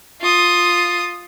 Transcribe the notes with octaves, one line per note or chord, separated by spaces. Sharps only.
F4 D#6